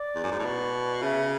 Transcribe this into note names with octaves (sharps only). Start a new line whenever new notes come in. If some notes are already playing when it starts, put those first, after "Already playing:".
Already playing: D5
E2
F#2
G#2
A2
B2
C#3 E5